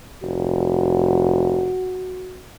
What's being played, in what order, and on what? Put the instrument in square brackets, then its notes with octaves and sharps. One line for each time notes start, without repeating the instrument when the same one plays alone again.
[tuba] F1 [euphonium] F#4